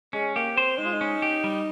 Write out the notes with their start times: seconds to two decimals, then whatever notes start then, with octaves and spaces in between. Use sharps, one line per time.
0.13 G#3 C#4
0.36 A#3 G4
0.57 C4 C5
0.78 G#3 D#4
0.86 F4
0.93 D#4
1.01 C#4
1.22 G4
1.44 G3